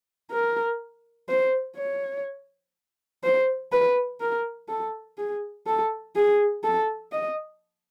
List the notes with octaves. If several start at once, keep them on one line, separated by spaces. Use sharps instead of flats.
A#4
C5
C#5
C5
B4
A#4
A4
G#4
A4
G#4
A4
D#5